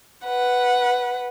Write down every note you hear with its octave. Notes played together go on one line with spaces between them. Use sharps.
B4 F#5